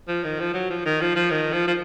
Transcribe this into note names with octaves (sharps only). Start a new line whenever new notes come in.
F3
D#3
F3
F#3
F3
D#3
F3
F3
D#3
F3
F3